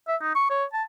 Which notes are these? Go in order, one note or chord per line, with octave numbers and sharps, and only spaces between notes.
E5
D#4
C#6
C#5
A5